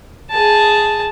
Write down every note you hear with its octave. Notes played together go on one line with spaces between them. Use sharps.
G#4 A5